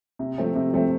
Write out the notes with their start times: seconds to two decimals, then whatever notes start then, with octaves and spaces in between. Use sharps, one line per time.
0.19 C3
0.38 F3 A3 C4
0.55 C3
0.73 F3 A3 C4